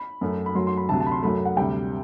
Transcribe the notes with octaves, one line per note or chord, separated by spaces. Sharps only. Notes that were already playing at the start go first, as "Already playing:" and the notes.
Already playing: B5
F#2 F#3 A3
B5
F#2 F#3 A3 C6
C6
B5
D2 C3 F#3 A5
A5
B5
C6
F#2 F#3 A3 B5
F#5
D2 C3 G3 G5